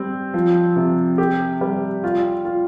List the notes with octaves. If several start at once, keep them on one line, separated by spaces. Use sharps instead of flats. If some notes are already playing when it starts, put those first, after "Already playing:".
Already playing: G3 C4
F3
C3
G4
G3
F4
F4